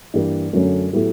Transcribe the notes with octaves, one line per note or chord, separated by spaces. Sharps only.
G2 E3 G3 A#3
F#2 D3 F#3 A3 C#4
A2 F#3 B3 E4 G4